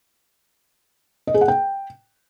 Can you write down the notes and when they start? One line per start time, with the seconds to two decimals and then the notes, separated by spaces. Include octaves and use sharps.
1.27 D#5
1.34 G#4
1.41 F#5
1.48 G5